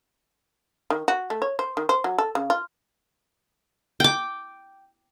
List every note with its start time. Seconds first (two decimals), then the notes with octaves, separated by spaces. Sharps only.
0.90 D#3
1.08 F#4
1.30 A3
1.42 C#5
1.59 C5
1.77 D#3
1.89 C5
2.04 F#3
2.18 A4
2.35 C#3
2.50 F4
4.00 G5 D6